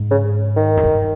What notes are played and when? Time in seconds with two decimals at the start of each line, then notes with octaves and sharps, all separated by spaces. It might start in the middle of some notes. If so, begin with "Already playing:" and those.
Already playing: G#2
0.11 C#3
0.56 D#3
0.77 F#2
0.84 G2